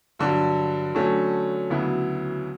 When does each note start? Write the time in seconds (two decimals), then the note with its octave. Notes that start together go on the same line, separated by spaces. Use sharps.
0.19 G2 D3 F#3
0.95 D3 F#3 A3 C#4
1.70 D2 C#3 F#3 B3 E4